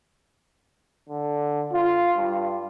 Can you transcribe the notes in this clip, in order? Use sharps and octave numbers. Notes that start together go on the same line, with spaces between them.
D3
F4
G2